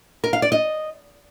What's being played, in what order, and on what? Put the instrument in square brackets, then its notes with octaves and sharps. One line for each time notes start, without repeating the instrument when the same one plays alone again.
[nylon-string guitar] A#4
F5
D5
D#5